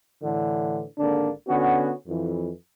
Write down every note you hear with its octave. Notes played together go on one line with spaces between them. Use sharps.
A2 D3 E3
G#1 D3 A#3 D4
D3 B3 C#4 F#4
F2 E3